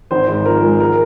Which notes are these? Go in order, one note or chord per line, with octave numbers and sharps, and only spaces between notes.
G#1 C5
G#2
F3 A#4
G#3
A#4